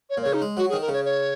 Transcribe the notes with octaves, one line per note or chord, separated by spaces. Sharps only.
C#5
A#2
C#5
C#3
D#4
G#3
F#3 F#4
G#4
D#3
A#4
C#3 C#5
C#5